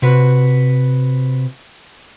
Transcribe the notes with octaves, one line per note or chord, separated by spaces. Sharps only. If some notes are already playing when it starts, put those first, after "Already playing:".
C3 F#4 B4